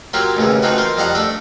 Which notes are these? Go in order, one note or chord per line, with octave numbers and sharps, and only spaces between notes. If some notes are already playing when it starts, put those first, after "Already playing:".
F#3 A#3 E4 F4 G4
A1 D#2 C#3 E3
E3 A3 C4 D#4 F4 F#4
A#3 F4 C5
F2 G3 D#5 F5 F#5 A#5
A3 D4 A4